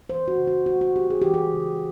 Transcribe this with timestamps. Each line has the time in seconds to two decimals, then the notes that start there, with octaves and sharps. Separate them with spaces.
0.09 E3 C5
0.28 F#4
0.38 C#3
0.47 F#4
0.66 A3 F#4
0.81 F#4
0.96 C4 G4
1.10 G#4
1.22 E3 G4
1.34 G#4
1.54 C#3